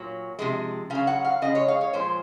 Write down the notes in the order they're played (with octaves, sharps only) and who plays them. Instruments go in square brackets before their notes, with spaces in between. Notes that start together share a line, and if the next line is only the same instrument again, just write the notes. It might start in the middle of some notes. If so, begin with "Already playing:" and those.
Already playing: [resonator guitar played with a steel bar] A#2 F#3
C3 F3 G#3
C#3 F#3 F5
F#5
F5
C#3 G#3 D#5
C#5
F5
C#5
A#2 F3 G#3 C5